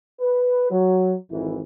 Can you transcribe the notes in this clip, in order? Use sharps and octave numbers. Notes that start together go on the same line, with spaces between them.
B4
F#3
G#1 F2 E3